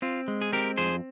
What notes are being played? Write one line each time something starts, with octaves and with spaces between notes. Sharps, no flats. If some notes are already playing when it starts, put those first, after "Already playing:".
C4 F4
G#3
G#4
C4 G4 A#4
F2 G#4 C5